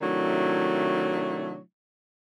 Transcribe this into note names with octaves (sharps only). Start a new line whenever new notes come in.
C3 D#3 F#3 A3 D4 E4